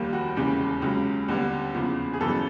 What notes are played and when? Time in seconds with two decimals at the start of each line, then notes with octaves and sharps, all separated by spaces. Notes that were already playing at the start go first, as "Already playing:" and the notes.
Already playing: F1 D#2 D#3 G3 A#3
0.13 F#4
0.36 E1 D#2 C#3 E3 G4
0.82 C#2 C#3 F#3
1.28 D#2 D3 G3 B3
1.74 F#1 E2 C#3 F3
2.13 G#4
2.21 G1 F#2 C#3 E3 A4